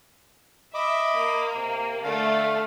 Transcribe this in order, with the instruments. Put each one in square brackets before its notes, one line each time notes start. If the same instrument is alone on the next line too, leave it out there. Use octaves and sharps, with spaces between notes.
[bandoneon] D#5 B5 D6 [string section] E5
[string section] A#3
[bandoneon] C3
[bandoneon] D3 F5 [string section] A3